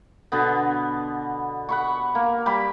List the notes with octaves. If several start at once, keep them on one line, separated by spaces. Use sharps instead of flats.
B2 D3 B3
F#5 B5 C#6
A#3
G3 G4 B5